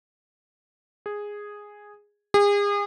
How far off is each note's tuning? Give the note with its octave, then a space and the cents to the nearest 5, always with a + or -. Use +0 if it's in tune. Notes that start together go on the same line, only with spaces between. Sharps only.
G#4 -5
G#4 -35